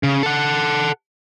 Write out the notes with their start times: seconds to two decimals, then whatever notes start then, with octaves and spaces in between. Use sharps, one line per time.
0.03 C#3
0.23 A4 F#5